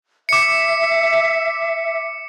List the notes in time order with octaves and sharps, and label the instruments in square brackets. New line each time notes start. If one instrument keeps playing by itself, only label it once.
[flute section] E5 [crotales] D6 C#7